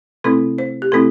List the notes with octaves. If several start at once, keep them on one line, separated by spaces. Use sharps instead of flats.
C3 A3 C4 E4 A4
C5
G4
C3 A3 C4 E4 A4